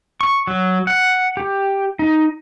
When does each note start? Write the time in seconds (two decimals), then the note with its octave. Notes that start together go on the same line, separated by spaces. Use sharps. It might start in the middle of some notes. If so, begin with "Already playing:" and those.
0.21 C#6
0.47 F#3
0.87 F#5
1.37 G4
1.99 D#4